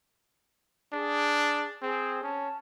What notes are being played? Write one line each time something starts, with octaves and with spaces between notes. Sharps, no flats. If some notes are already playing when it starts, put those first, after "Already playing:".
D4 G#4
C4 G#4
C#4 A5